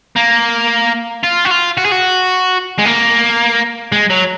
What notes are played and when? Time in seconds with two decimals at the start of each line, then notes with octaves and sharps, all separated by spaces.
0.16 A#3
1.23 F4
1.45 F#4
1.51 F4
1.77 F#4
1.85 G#4
1.91 F#4
2.78 G#3
2.85 A#3
3.92 G#3
4.10 F#3